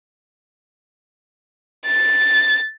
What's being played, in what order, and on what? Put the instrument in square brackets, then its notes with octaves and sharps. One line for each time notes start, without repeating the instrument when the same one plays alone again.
[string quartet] A6